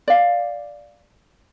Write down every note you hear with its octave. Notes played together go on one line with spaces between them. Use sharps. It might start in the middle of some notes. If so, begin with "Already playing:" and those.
D5 F5